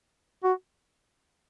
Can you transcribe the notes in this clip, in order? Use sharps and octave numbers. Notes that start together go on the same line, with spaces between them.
F#4